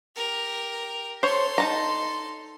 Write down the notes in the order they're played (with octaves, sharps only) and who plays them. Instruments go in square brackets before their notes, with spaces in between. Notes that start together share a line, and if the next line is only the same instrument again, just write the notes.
[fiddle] G4 A#4
[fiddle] A4 C6 [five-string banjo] C5 C#5
[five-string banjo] D#4 A5 A#5